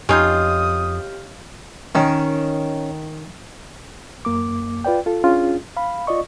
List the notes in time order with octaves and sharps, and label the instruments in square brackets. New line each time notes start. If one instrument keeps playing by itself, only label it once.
[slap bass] F2 [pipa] C#4 D#4 F4 [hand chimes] G4 F6 G6 [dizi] D#6
[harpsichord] D#3 [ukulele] C#4
[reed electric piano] F#2 A#3 D6
F4 B4 D5 G5
F4 A4
C#4 D4 F4 G#4
F5 B5
F4 D5 D#5 C#6